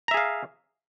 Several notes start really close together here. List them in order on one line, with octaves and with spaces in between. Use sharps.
A#5 E5 G#4 F5